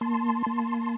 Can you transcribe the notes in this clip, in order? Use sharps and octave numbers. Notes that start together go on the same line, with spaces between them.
A#3 A5 C6
A#3